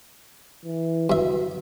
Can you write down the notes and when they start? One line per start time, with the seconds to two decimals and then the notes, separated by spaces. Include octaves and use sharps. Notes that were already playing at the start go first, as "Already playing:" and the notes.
0.65 E3
1.10 G2 F#4 E5